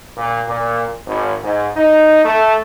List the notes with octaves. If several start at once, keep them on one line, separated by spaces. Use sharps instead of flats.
A#2
A#2
G#1
G#2
D#4
A3